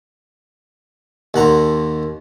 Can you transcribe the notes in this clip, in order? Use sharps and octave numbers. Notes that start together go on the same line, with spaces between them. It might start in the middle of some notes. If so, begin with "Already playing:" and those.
D#2 F#5 A#5 C6